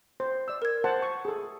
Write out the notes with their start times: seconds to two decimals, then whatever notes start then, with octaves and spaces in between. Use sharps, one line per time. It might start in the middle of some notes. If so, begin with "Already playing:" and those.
0.20 C5
0.48 D5 E6
0.62 A#4 G#6
0.84 C5 F#5 A5
1.02 C#6
1.25 G#4 A4